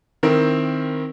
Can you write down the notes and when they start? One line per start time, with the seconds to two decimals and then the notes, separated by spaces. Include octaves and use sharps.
0.23 D#3 C4 E4 A#4